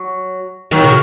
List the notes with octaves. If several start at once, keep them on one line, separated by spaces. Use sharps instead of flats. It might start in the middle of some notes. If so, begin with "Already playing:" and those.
Already playing: F#3
D#3 F#3
C#3